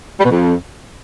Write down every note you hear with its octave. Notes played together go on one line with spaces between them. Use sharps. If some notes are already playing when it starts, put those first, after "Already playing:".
G3
B2
F2